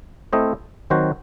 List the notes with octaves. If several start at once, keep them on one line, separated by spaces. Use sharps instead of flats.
A3 C4 E4 C5 D#5
D#3 F#3 C4 F#4 C5